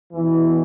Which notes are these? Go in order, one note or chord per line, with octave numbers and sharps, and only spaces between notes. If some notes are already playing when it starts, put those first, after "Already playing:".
E2 B2 E3